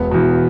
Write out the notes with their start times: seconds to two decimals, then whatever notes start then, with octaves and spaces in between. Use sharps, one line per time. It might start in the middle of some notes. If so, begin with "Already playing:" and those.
Already playing: E1 B3
0.11 E2 B2